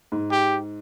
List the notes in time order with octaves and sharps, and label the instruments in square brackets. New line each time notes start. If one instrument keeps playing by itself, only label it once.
[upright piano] G#2
[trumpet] G4